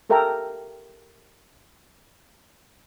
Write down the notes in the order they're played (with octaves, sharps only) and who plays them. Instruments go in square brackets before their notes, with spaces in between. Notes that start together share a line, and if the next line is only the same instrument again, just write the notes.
[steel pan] G4 A4 A#4 E5 G5 A#5